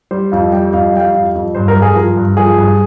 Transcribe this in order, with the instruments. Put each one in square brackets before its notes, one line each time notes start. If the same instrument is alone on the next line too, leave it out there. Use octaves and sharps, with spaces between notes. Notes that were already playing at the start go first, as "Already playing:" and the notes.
[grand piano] G3 C5
F2 F5
G3 G5
F2 F5
G3 G5
F5
F2
F2
G2 C5
A#4
G2
G#4
F3 A#4
G2
F3 G#4
G2